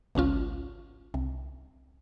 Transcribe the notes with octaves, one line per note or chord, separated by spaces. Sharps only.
G#1 C#2 C#4 F4
C2